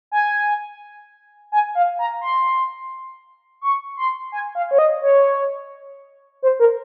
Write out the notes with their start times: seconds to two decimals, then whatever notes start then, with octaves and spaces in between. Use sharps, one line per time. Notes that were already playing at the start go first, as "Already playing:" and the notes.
0.11 G#5
1.52 G#5
1.75 F5
1.99 A#5
2.21 C6
3.61 C#6
3.97 C6
4.32 G#5
4.55 F5
4.71 C#5
4.78 D#5
5.02 C#5
6.42 C5
6.60 A#4